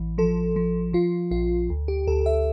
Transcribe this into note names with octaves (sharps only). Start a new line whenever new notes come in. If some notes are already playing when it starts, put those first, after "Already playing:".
Already playing: A1 E3
F3 A4
F3
F3 F4
A#1 F4
D2
G4
D2 A4
E5